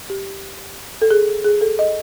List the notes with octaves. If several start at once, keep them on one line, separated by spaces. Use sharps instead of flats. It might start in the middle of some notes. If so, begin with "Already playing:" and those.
G4
A4
G#4
G#4
A4
D#5